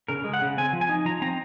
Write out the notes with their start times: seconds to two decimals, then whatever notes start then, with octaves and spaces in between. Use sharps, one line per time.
0.08 C#3 A#4
0.24 G#3
0.34 F#5
0.42 C#3
0.58 C4 G#5
0.73 F3
0.81 G#5
0.89 D#4
1.05 F3 A#5
1.22 C4 A#5